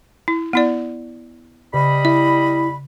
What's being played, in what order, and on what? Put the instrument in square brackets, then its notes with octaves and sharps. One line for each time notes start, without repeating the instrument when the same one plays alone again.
[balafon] E4
B3 E4 D5
[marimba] C#3 [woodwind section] G3 D#5 B5
[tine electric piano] E4 [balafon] E5